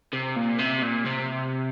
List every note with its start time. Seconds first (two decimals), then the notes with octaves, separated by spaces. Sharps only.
0.13 C3
0.36 A#2
0.59 C3
0.83 A#2
1.06 C3